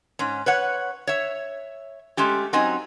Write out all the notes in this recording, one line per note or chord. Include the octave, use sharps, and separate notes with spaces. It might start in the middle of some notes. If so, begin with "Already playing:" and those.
G#2 C#4
B4 C#5 F#5
C#5 E5
G#3 A3 C#4 G4
F#3 C4 C#4 D#4 D#5 G#5